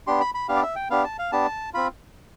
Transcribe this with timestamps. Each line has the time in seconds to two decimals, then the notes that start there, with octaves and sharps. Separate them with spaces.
0.07 B3 D4 G4 C6
0.21 B5
0.34 B5
0.48 B3 D4 G4 F5
0.56 D5
0.63 E5
0.76 G5
0.90 B3 D4 G4 F5
1.04 A5
1.19 F5
1.32 B3 D4 G4 A5
1.74 C4 F4 B5